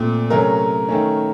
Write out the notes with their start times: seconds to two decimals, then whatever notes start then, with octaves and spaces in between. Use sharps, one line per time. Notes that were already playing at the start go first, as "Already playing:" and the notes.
Already playing: A#2 A3 C4
0.30 C3 F#3 A3 C#4 A#4
0.89 D#3 A3 C#4